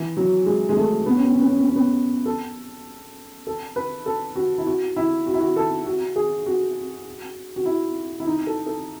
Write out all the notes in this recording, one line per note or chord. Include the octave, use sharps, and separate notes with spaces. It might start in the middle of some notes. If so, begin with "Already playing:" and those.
Already playing: E3
F#3
G#3
G#3
A3
B3
C#4
B3
C#4
B3
C#4
B3
C#4
B3
A4
A4
B4
A4
F#4
E4
F#4
E4
F#4
E4
F#4
A4
F#4
G#4
F#4
F#4
E4
E4
D#4
A4
A4